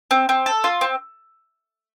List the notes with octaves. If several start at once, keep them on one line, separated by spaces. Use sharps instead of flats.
C4
C4
A4
F4
C4